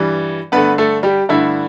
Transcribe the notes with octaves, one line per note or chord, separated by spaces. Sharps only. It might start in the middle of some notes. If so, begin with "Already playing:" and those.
Already playing: G2 E3 G3
G2 D3 A3 B3 B4
A3 A4
G3 G4
G2 D3 A3 E4